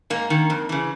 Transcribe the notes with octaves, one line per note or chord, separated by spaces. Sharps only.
G#2 A#3
D#3
F2
C#3 E3